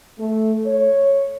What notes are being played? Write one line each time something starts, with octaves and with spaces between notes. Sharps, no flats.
A3
C#5